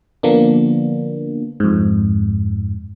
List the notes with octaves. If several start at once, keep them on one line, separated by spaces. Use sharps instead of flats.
D3 F3 A#3 B3 D4
F2 G#2